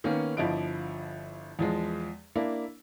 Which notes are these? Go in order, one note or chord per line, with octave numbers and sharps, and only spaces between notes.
D#3 A#3 B3 C#4
G1 F3 E4 D#5 D7
E2 F3 G#3
A#3 D4 E4